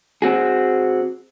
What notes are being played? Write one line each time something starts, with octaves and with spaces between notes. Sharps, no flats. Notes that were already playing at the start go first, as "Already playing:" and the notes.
C4 F#4 G#4